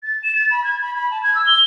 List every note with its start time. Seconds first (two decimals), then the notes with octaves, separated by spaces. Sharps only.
0.03 A6
0.23 E7
0.35 A6
0.51 B5
0.64 G#6
0.82 B5
0.96 B5
1.11 A5
1.23 G#6
1.35 E6
1.47 G7